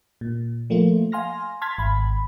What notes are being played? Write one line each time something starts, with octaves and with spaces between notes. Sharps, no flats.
A#2
F3 A3 A#3 F4
F5 G#5 C6 F6 A#6
A5 C6 F6 G#6 A6 B6
G#1 B5